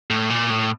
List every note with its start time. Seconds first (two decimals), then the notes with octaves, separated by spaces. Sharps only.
0.10 A2
0.30 A#2
0.50 A2